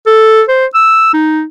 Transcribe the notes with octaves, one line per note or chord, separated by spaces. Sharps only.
A4
C5
E6
D#4